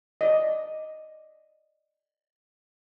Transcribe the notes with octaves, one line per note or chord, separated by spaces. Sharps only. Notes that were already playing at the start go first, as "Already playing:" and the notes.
D5 D#5